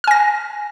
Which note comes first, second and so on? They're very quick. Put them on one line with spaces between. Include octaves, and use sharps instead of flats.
F6 G#5 A#6